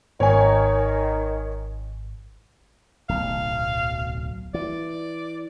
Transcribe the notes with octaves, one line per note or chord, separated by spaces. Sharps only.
G#1 D#3 C#5 G#5
D1 B1 F5
E3 D5